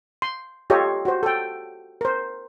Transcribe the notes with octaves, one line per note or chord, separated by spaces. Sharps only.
C6
F4 G4 A4 C#5 D#5
F#4 C5
A4 G5
A#4 C5